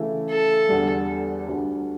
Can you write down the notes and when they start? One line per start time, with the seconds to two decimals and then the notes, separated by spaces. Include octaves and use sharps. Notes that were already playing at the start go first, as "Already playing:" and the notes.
Already playing: C#3 E3 A3 E4
0.30 A4
0.69 E2 D3 G3
1.48 D2 D3 G3 D4